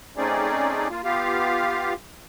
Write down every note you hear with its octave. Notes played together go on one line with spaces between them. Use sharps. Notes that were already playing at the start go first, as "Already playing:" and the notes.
A3 C4 C#4 D#4 G#4 D5
A#3 F4
B3 F4 G4 F5